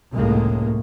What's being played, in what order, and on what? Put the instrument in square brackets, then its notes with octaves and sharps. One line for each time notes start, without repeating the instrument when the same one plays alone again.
[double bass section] F1 C#2 A2 G#3 A#3